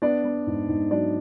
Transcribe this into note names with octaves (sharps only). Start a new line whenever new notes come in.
B3 D4 D5
B3
G#2
G#2
F#3 D4 D5